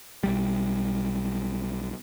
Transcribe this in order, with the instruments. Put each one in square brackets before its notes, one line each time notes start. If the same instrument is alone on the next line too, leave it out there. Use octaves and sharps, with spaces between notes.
[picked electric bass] B1 G3